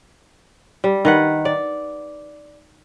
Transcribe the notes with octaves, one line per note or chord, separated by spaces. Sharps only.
G3
D#3 B4 F#5
D5